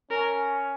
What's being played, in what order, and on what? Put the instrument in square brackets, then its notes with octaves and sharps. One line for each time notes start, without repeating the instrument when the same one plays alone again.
[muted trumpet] C#4 [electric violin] A#4